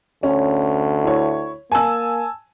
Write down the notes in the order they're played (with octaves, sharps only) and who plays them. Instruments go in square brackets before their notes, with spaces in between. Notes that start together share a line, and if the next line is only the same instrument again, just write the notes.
[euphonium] D2 [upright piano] C#4
[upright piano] E4 C#5
[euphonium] A#3 [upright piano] G#5 A5 E6